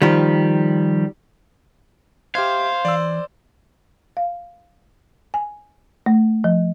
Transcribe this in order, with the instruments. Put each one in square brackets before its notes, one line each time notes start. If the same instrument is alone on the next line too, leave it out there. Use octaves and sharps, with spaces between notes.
[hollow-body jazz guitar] D#3 F3 G3
[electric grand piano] G4 F6 G#6 [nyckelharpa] C5 [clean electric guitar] E5 [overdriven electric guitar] F5
[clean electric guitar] E3 [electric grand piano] D5 E6
[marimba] F5
G#5
A3
F3